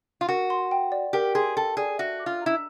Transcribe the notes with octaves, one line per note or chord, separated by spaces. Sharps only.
F4
F#4 A#4
C6
G5
D5
G4 A#4
G#4 C6
A4 G5
G#4 D5
F#4 E5
D6
F4
E4 A#5